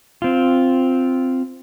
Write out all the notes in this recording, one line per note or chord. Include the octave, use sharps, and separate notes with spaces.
C4 F4